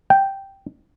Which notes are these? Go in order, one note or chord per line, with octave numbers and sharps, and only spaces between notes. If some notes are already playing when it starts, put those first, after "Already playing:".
G5